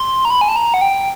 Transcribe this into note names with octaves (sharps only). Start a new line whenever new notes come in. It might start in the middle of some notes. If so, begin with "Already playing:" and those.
Already playing: C6
A#5
B5
G#5
A5
A#5
F#5
G5